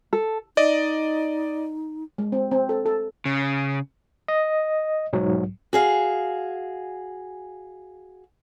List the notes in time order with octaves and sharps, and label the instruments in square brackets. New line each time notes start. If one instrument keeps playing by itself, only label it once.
[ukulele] A4
[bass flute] D#4 [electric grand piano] D5 D#5
[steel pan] G#3
C4
C4
A4
A4
[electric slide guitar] C#3
[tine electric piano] D#5
B1 G#2 F#3
[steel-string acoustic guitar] F#4 G#4 F5